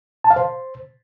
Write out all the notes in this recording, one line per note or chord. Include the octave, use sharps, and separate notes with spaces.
A5
F5
C5